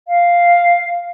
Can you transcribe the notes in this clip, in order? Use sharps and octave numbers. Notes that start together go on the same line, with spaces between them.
F5